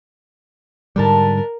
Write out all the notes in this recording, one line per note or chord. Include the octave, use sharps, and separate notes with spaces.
G#2 D3 G3 D4 A#4 B4 A5